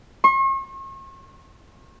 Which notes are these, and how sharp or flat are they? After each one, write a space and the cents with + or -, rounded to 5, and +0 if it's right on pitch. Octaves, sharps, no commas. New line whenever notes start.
C#6 -45